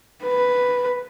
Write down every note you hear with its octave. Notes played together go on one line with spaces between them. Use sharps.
B4